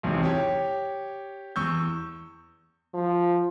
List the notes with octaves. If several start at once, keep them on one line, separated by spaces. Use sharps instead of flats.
B1 E2 G#2 C3
G4 C#5
E2 C#6 E6 G6
F3